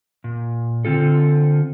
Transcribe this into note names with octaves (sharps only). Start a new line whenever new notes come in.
A#2
D3 C4 F4 A4